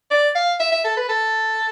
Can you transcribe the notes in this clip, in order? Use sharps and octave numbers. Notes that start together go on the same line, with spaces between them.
D5
F5
E5
E5
A4
B4
A4